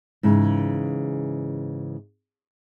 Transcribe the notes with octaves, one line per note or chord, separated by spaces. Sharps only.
G#2 C#3 E3